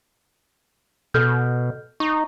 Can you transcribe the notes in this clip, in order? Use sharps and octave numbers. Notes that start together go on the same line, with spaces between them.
B2 A4 F6 G6
D#4 C#6